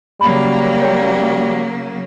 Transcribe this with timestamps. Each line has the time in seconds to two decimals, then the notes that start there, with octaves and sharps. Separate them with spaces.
0.21 C#3 F#3 G3 A#3 B5
0.82 C#5 G5